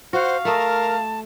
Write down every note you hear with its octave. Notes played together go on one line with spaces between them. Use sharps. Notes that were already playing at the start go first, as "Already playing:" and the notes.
F#4 C5 F5 F#5
A3 A#4 D#5 A5